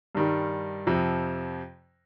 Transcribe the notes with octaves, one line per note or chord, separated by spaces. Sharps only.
G2 D#3 G3
F2 C3 F3